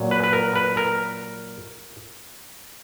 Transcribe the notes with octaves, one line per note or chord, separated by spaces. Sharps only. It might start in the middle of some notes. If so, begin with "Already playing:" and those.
Already playing: A#2 F#3
B4
B4
A#4
B4
A#4